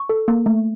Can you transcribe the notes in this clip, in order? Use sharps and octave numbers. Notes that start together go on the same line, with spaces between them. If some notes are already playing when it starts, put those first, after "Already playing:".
Already playing: C#6
A4
A#3
A3